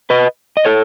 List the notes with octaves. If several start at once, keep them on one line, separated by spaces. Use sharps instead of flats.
B4 D#5
D#5
A4 C#5